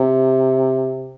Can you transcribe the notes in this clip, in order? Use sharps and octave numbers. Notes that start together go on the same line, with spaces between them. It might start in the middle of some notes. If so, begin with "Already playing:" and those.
Already playing: C3